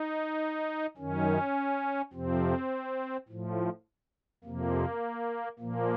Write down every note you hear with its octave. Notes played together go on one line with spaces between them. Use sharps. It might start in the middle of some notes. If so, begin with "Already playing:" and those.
Already playing: D#4
F#2 D#3 C#4
F2 C3 F3 C4
A2 F3
F2 C3 F3 A#3
A#2 F3 A#3